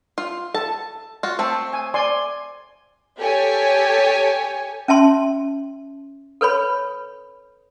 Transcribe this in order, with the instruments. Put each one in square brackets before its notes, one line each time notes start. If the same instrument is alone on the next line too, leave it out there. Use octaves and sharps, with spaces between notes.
[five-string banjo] F4
[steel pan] A4 [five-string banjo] A5
[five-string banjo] F4 F#4
A3 C4
[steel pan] G#5
D5 G#5 C6
[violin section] G4 A4 C#5 G#5
[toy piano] C#4 E5 A5 C6
A4 B4 C#5 B5